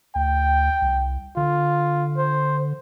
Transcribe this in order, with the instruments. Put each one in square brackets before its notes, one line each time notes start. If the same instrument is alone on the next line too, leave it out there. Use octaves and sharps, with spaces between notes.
[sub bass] D2 [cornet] G5
[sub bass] C2
[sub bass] D3 [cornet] F4
[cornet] C5